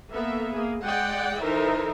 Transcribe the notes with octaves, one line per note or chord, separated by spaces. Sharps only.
A#3 B3 A4 E5
A#3 G#4
G#3 G#4 D5 F#5 G5
E3 D#4 A4 A#4 C5 E5